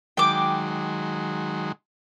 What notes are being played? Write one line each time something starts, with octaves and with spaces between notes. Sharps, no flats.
D#3 F#3 G#3 G5 D6